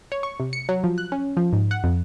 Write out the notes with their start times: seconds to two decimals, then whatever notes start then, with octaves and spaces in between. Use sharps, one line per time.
0.12 C#5
0.23 C#6
0.40 C3
0.53 C#7
0.69 F#3
0.84 F3
0.98 F#6
1.12 C#4
1.37 F3
1.53 G#2
1.71 F#5
1.84 F2